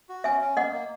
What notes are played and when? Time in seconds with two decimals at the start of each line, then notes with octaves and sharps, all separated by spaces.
0.09 F#4
0.24 C#4 E5 G#5
0.41 C#4
0.57 A#3 D#5 F#5
0.72 A#3